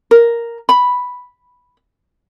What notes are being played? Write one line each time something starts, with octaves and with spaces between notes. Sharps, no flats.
A#4
B5